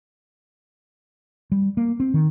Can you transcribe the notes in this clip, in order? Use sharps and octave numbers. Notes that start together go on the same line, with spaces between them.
G3
A#3
C4
D#3